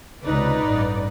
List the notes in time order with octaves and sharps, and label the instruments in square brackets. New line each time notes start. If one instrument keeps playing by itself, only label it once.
[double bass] C#2 C3 [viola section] D#4 B4 D5
[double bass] A1 G2